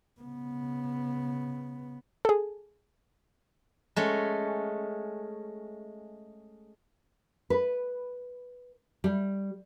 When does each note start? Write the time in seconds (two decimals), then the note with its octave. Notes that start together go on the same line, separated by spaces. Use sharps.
0.21 C#3 B3
2.25 G#4 A4
3.96 G#3 A3 C#4
7.50 B4
9.04 G3